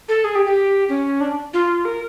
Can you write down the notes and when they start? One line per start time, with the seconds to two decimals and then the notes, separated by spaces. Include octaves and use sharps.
0.09 A4
0.24 G#4
0.35 G4
0.46 G4
0.89 C#4
1.21 D4
1.53 F4
1.85 A#4